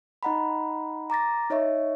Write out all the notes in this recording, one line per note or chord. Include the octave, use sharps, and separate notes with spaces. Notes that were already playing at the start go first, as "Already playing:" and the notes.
D#4 D#5 F#5 A#5 B5
A#5 D6 A6 A#6
D#4 C#5 D#5 E5 C#6